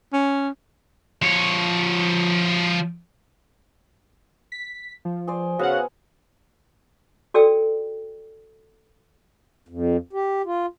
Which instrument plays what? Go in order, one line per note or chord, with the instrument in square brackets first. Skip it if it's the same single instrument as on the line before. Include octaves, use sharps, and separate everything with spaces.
[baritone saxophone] C#4
[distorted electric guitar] F3 C#5
[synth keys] B6
F3
[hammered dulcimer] G#4 C5 D5
[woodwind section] C#3 [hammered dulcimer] B3 G#4 [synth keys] F#4 F5 F#5
[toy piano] F#4 A4 D5 G5 E6
[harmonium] F2
G4
F4